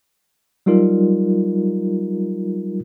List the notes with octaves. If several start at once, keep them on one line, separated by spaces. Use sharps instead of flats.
F#3 G3 D#4 F4 A#4